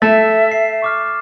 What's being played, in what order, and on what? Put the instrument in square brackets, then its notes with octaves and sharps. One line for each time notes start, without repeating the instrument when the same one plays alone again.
[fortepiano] A3 [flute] E5 [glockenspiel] A6 E7
[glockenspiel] C7
C#6 D6 F6